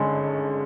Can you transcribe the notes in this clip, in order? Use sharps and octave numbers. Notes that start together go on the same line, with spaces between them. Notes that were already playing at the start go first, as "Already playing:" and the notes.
Already playing: G#1 G2 D3 G#3 C#4